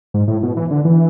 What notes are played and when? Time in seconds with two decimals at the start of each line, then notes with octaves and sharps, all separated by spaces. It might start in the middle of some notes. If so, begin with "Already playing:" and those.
0.14 G#2
0.28 A2
0.43 B2
0.57 E3
0.71 D3
0.85 E3